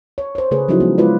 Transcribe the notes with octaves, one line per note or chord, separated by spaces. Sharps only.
C#5
C5 C#5
C#3 A3 G#4 B4 C#5
F3 F#3 C#4 D#4 E4 F#4
G#3 B3
G#3 E4 F4 B4 D5